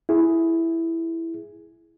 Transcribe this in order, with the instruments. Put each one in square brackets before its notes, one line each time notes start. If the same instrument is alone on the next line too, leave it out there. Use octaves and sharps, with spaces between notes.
[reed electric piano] E4 G#4